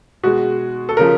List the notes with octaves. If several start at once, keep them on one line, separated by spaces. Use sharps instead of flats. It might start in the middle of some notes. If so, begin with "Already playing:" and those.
B2 G#3 F#4
A4
C#3 F3 A#4